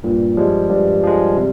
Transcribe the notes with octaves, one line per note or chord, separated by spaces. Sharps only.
G2 A#2
F3 G3 G#3
G2 G3
F3 G#3
C3